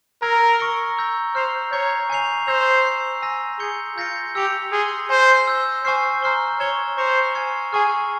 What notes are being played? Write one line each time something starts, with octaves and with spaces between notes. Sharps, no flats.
A#4 A#5 E6 G#6 C7
C#6 E6 A#6 C#7 G7
A#5 E6 G6 A#6
C5 F6 C7 F7
C#5 A#5 C#6 G6 C7
G#5 C#6 G6 C7 F7
C5 C#6 E6 G6 A#6 F7
C6 G6 C7
G#5 E6 A#6
G#4 G6 C#7 G7
F4 G6 A#6 C#7
G4 E6 A#6 C#7 F7
G#4 C6 F6 C7 G7
C5 G#5 C6 G6 A#6
E6 G6 A#6
C5 G#5 C#6 F6 C7
C5 A#5 F6 C7 G7
C#5 F6 G#6 E7 G7
C5 C#6 G6 A#6 C#7 F7
G#5 C#6 F6 G#6 C7
G#4 G#5 C#6 F6